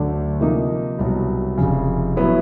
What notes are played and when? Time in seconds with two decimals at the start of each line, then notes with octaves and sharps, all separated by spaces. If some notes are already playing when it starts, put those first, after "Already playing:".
Already playing: D2 D3 F#3 A3 D4
0.40 C3 F3 A#3 D#4
0.99 C2 B2 F#3
1.57 F1 F2 C#3
2.16 A2 F#3 B3 E4